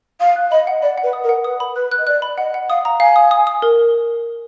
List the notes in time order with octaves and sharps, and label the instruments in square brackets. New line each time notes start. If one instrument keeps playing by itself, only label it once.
[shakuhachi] F5 [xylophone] D#6
[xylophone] F#6
[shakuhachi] D#5 [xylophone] B5
[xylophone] F#5
[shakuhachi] D5 [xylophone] B5
[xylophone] F#5
[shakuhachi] B4
[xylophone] D#6
[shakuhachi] A#4
[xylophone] F#5
[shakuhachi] B4 [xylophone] D#6
[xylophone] B5
[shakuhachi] B4 [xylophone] F#6
[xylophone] F#6
[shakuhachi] D#5
[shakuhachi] D5 [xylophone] F#6
[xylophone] B5
[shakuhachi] D#5 [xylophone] F#5
[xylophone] F#5
[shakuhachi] F5 [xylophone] D#6
[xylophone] A#5
[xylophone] F5 [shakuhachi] G#5
[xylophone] D#6
D#6
D#6
A#4